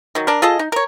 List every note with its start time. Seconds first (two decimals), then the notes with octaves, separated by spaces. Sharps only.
0.15 D#3 F#3
0.27 D4 A#4
0.42 F4 G#4 A4 D#5
0.59 D#4
0.72 A#4 C#5